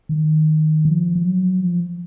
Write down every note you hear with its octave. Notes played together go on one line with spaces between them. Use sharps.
D#3
F3
F3
F#3
F3